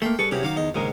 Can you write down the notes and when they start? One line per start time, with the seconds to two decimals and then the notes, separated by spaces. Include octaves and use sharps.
0.02 A3 A#3 G5 C6
0.19 G3 G#4 A4 B4 C#6
0.31 C3 E3 F#3 C#4 G4 G#4
0.43 D#3 F#3 F5 D6
0.56 E2 D#5
0.74 A#1 D#2 G#2 C#3 G#4 A#4